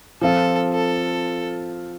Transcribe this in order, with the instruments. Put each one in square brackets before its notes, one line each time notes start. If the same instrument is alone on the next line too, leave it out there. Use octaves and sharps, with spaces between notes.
[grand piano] F3 C4 F4 [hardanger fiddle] A4
[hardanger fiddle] A4